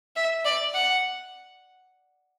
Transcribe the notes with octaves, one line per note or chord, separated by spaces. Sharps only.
E5
D5
F#5